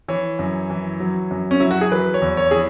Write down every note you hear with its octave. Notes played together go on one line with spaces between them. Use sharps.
E3 C#5
F#2
E3
F#3
F#2
C#4
F#3 E4
F#4
G#4
E3 B4
C#5
E2
C#5
E3 G#4